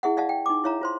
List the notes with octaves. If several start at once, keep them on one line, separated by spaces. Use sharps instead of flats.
E4 G#4 E5 F#5
D5 D#5 F5 F#5 A5
G5
D#4 D6
E4 C#5 E5 F5 A#5
F4 C5 C6